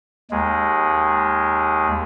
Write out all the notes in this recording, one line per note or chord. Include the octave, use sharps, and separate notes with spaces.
D#2 G#3